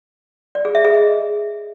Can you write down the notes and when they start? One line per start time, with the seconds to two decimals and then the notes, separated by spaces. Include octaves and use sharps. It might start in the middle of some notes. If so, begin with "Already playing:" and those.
0.55 D5
0.65 G#4
0.75 E5
0.85 G#4
0.94 D#5